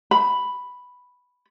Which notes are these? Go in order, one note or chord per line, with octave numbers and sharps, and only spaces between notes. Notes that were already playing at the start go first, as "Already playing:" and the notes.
B5